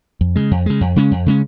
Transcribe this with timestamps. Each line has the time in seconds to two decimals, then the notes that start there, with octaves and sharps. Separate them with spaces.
0.21 F2
0.36 C#3 G#3
0.51 F2
0.66 C#3 G#3
0.81 F2
0.96 C#3 G#3 C#4
1.11 F2
1.26 C#3 G#3 C#4